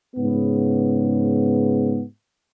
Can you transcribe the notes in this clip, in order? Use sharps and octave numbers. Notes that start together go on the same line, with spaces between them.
G#2 C#3 B3